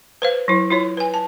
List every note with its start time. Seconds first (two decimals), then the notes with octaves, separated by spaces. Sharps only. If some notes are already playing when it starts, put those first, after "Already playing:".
0.22 B4 C5 F5
0.48 F#3 E4
0.71 E4 F4 C#5
0.97 B4 G#5
1.14 A5